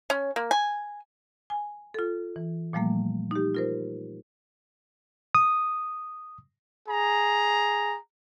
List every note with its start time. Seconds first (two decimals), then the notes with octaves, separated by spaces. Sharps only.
0.10 C#4
0.36 A#3
0.51 G#5
1.50 G#5
1.94 F4 A4
2.36 E3
2.73 A#2 F3 G3 A3 A#3
3.31 D#4 G4
3.55 F4 A#4 C5
5.35 D#6
6.88 G#4 A#5